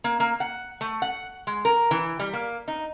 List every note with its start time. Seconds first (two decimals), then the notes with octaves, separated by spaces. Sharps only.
0.04 A#3
0.20 A#3
0.40 F#5
0.81 A3
1.02 F#5
1.47 G#3
1.65 A#4
1.91 E3
2.20 G3
2.33 A#3
2.68 D#4